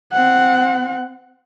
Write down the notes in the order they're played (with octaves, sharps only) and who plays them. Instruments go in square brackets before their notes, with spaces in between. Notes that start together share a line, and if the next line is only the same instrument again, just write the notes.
[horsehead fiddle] C4 F#5